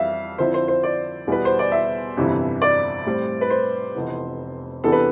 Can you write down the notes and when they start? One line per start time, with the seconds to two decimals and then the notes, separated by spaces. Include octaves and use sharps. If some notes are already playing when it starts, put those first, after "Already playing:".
Already playing: F2 E3 G3 E5 F5
0.38 F2 D3 F3 C4 E4 C5
0.54 C5
0.68 C5
0.83 D5
1.27 E2 B2 G3 B3 E4 B4
1.45 C5
1.59 D5
1.72 E5
2.17 G1 F2 C3 E3
2.62 D5
3.05 A2 G3 C4
3.41 B4
3.50 C5
3.95 F1 F2 E3 B3
4.84 E2 C3 E3 B3 D4 A4
4.92 B4